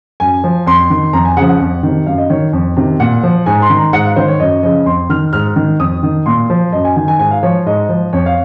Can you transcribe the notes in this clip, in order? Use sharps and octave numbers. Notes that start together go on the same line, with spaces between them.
F#2 G#5
F3
F2 C6
D#3
F2 A#5
G#5
C#3 F3 F#5
F#5
F2
C3 D#3
F#2 F5
D#5
D#3 C#5
F2
C3 D#3
A#2 F#5
F3
G#2 G#5
C6
D#3
A#5
G#2 F#5
F5
D#3 C5
C#5
F#2 D#5
C#3 F3 D#5
F2 C6
D#3 F6
G#2 F6
D#3
F2 D#6
D#3
A#2 C6
F3
F#2 D#5
G#5
D#3 G#5
G#5
G#2 G#5
F5
F3 C#5
G#2 D#5
F3
F2 C#5
F5